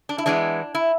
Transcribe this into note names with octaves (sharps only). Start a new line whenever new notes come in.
D4
E4
E3 G#3 B3 D4
E4